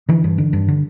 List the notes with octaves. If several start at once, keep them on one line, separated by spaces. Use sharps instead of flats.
D3 E3
G2
D3
G2
D3